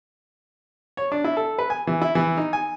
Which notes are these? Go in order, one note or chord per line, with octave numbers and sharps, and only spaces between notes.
C#5
D4
E4
A4
B4
G#5
E3
E4
E3
D#4
G#5